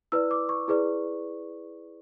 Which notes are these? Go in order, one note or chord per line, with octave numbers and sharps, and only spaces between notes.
E4 B4 D5 E6
D6
C#6
E4 G#4 B4 D5